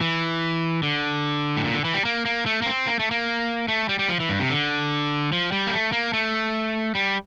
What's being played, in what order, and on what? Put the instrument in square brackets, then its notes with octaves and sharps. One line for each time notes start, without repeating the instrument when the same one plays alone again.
[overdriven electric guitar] E3
D3
A2
A#2
D3
E3
G3
A#3
A#3
A3
A#3
C4
A#3
A3
A#3
A3
G3
G3
F3
E3
G2
C3
D3
F3
G3
A#3
A3
A#3
A3
G3